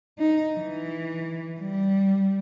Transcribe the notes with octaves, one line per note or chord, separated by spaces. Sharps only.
D#4
E3
G3